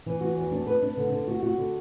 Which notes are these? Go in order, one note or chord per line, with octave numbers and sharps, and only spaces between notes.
E3
F#4
E2
D4
B4
D4
D3
D3
F#4
F#4
D3